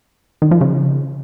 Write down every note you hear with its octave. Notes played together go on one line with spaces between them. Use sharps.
D#3
F3
C#3